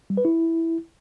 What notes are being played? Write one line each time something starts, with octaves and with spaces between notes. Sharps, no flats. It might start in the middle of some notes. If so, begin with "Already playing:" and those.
G3
B4
E4